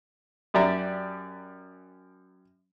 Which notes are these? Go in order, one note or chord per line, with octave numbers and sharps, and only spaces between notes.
F#2 G4 D5 E5 A#5